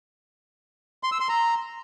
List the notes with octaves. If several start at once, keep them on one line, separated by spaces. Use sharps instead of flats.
C6
E6
C6
A#5